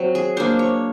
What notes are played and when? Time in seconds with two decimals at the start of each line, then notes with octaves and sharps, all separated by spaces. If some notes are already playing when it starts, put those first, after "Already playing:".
Already playing: F#3 C4
0.15 G#4
0.37 A#3 D4 C5
0.59 C#5